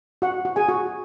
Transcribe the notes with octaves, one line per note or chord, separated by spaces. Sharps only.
F#4 F#5
F#4
G#4 G#5
F#4